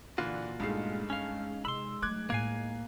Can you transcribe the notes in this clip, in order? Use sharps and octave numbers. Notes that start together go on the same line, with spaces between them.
A#2 D3 E3 D4 F4 F#4
G2 G#3 A3 C4 D#4 C7
C#4 F5
C3 B5 C6 E6
F#3 A3 D6 F#6 G#6
A2 A#3 G#5 G#6 C7